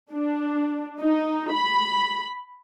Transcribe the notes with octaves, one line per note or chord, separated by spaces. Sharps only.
D4
D#4
B5